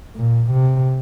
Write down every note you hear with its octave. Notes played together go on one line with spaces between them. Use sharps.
A#2
C3